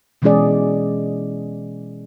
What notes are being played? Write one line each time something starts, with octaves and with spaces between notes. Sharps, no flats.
B2 E3 G#3 C#4 G#4 D5